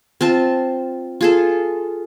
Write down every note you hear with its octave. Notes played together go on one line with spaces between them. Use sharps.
C4 F4 A5
F4 G#4 A4